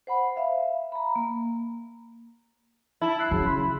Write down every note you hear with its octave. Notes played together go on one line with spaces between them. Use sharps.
C5 F#5 B5
E5 F5
A#5 B5
A#3
E4 A5
E6 F#6 C7
C#3 F#3
B5 C6